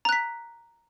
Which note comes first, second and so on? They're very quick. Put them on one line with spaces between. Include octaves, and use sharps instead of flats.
A#5 F#6 B6